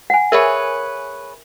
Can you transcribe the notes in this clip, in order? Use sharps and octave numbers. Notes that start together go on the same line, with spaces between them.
F#5 G#5
G#4 A#4 B4 C#5 E5